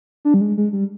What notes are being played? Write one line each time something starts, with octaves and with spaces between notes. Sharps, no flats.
D4
G3
G#3
G#3
G3